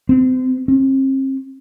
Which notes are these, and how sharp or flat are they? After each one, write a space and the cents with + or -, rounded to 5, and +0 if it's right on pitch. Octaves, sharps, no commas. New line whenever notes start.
C4 -30
C4 +40